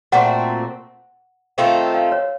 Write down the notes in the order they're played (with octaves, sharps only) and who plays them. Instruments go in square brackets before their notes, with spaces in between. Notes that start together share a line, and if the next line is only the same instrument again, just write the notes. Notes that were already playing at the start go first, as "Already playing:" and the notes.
[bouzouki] A#2 A3 C4 F#4 [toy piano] F#5
[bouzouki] D#3 A3 C4 F4 [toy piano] F5
[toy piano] F5
C#5